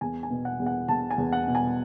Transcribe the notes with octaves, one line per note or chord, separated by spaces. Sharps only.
E2 G#5
G#5
B2
F#5
E2
F#5
E2 A5
G#5
E2
F#5
B2
G#5